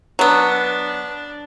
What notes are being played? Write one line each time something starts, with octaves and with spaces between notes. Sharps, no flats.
F#3 B3 D4